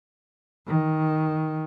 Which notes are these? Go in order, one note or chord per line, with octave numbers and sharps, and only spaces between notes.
D#3